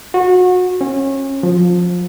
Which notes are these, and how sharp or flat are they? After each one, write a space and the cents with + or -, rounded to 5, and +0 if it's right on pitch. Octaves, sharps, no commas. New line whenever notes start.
F#4 -30
C#4 -30
F3 +20